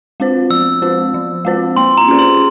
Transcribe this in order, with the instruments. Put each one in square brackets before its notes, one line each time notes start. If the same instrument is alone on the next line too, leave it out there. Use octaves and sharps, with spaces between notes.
[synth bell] G#3 C4 F4 C5
[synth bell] F3 [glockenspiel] E6
[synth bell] G#3 C4 F4 C5
F3
G#3 C4 F4 C5
[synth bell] A#3 [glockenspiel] C6
[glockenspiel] A#5
[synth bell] C#4 F4 G#4 C5
[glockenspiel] C6